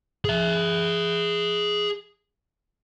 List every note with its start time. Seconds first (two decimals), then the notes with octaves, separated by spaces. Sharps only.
0.25 G#4 E5